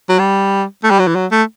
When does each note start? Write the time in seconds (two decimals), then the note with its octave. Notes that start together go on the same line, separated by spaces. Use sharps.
0.09 F#3
0.19 G3
0.84 A3
0.91 G3
0.99 F#3
1.07 E3
1.15 F#3
1.31 A3